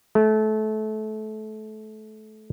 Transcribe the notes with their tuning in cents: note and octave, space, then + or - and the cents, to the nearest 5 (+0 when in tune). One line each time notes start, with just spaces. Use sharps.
A3 -25